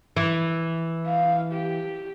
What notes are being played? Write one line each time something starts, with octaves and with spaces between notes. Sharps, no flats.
E3
F5
G4